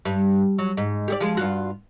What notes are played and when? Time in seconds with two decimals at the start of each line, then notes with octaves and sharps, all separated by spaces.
0.05 G2
0.58 F#3
0.77 G#2
1.08 G4 G#4 D5
1.20 F3 G#3
1.37 G2 F4 F#4